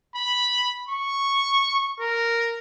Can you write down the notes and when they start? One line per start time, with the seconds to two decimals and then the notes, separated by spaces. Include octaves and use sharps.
0.15 B5
0.89 C#6
2.00 A#4